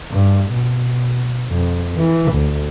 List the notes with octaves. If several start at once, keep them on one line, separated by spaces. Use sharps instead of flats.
G2
B2
F2
E3
D2